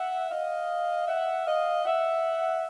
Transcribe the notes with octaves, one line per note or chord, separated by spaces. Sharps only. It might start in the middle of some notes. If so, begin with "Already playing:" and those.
Already playing: E5 F#5
D#5 F5
E5 F#5
D#5 F5
E5 F#5